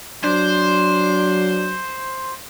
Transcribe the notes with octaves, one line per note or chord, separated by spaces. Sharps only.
F#3 D4 C5